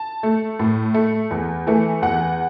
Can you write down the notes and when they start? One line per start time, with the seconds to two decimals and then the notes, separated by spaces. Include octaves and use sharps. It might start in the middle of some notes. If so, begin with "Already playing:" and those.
Already playing: A5
0.23 A3
0.59 A2
0.94 A3
1.31 E2
1.67 E3 A3
2.02 E2 F#5